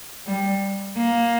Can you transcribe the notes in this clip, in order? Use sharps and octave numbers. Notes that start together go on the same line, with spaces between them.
G3
A#3